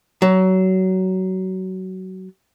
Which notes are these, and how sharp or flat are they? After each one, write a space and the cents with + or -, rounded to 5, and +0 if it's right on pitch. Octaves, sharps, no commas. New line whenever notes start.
F#3 +20